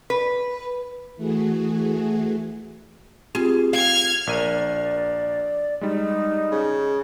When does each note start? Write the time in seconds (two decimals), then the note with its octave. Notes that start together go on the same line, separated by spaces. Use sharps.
0.10 B4
1.16 E3 A3 F#4 G#4
3.35 C4 F4 G4 G#4
3.73 F5 F6 G#6
4.27 A#1 A#4 D5 D#7
5.81 G3 G#3 D#4
6.51 C#3